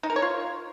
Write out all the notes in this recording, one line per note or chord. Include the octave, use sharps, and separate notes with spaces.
D#4
A#4
C#5
F4